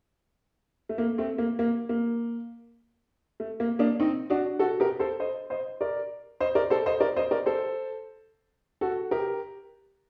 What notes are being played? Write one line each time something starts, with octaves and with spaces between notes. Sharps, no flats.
A3
A#3
A3 C4
A#3
A#3
A#3
A3
A#3
A#3 D4
C4 D#4
D4 F#4
F#4 A4
G4 A#4
A4 C5
C5 D#5
C5 D#5
A#4 D5
C5 D#5
A#4 D5
A4 C5
C5 D#5
A#4 D5
C5 D#5
A#4 D5
A4 C5
F#4 A4
G4 A#4